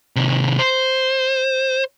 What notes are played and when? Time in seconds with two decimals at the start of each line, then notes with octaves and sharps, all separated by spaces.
0.16 C3 D#3
0.59 C5